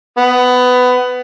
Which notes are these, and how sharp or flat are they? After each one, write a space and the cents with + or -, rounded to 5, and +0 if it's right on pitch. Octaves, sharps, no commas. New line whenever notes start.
B3 +20